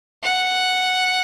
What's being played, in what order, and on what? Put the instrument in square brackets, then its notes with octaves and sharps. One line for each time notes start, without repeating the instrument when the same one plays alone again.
[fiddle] F#5